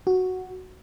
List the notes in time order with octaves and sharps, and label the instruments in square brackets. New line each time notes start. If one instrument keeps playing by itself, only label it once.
[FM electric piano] F#4